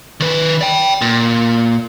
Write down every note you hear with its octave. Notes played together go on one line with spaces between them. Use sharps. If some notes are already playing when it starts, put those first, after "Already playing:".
D#3 B4
D5 G5
A#2